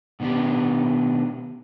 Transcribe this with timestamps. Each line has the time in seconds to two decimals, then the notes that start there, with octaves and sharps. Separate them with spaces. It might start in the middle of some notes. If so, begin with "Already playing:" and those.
0.20 B2 D#3 B3 D4 G4